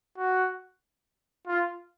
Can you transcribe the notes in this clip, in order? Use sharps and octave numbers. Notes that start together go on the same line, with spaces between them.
F#4
F4